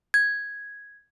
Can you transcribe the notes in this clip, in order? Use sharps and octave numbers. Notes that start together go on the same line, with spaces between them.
G#6